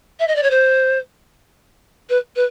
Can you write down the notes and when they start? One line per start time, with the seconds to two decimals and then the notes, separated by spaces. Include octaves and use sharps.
0.19 E5
0.27 D#5
0.35 D5
0.43 C#5
0.50 C5
2.09 B4
2.36 B4